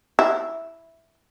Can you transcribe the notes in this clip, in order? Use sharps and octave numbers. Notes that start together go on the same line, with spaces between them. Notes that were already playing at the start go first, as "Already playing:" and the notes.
E4